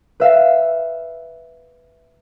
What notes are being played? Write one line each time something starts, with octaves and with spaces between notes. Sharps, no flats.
B4 E5 F5